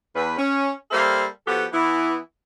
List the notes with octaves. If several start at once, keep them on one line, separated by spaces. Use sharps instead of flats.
E2 B4
C#4
G3 A#3 A4 C5 E5 F5
F3 B3 F#4 G4 A4
E3 B3 E4